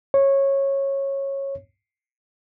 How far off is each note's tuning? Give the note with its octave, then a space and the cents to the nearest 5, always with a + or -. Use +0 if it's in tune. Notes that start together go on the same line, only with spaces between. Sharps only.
C#5 -15